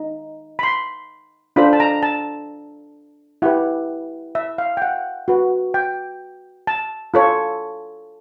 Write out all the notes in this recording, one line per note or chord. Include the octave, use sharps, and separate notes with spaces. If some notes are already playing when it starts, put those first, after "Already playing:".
Already playing: D#4
B5
C6
D4 F4 A4 C5 B5
A5
A#5
A5
E4 G4 B4 F#5
E5
F5
G5
F#5
F#4 B4
G5
A5
F4 A4 C#5